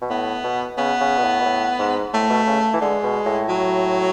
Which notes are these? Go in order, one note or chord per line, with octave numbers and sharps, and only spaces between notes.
B2
A2 B3
B2
C#3 B3
C#3
B2
A2
B2
A2
G#2
A2 A3
B2
C#3
E3
D3 G#3
B2
A2
F#3